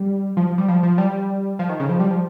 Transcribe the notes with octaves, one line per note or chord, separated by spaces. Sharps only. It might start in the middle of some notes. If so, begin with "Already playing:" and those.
Already playing: G3
F3
F3
G3
F3
F3
G3
F3
D#3
C#3
F3
G3
F3